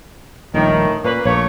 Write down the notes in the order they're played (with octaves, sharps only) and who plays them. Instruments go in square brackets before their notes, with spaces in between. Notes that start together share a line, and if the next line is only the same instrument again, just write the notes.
[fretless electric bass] D#1 A#1 [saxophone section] A2 D#3
[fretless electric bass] A#2 [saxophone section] A#3 C#4 B4
[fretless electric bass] A#1 [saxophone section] A3 A#3 C#5